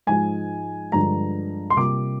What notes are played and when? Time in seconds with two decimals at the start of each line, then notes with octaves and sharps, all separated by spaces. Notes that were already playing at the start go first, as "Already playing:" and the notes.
0.07 G#2 F3 G#3 G#5
0.92 G2 D3 F3 G#3 D4 A#5
1.70 C6
1.76 C3 G3 A#3 F4 D6